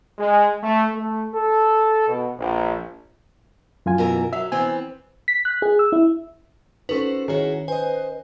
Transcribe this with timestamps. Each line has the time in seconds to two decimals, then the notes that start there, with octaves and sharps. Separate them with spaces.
0.19 G#3
0.63 A3
0.93 A3
1.34 A4
2.08 B2
2.38 A#1
3.86 F#2 F4 G#5
3.98 B2 E3 A#4
4.33 F#3 E5
4.52 E3 B3 C4 G#5
5.28 B6
5.45 F#6
5.62 G#4
5.79 E6
5.92 E4
6.89 C#4 D#4 F#4 A4 B4 C5
7.28 D#3 E4 F#4 G#4 C#5
7.68 B4 C5 D#5 G#5